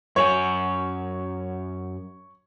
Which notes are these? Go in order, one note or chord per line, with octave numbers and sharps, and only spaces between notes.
F#2 F4 C#5 G#5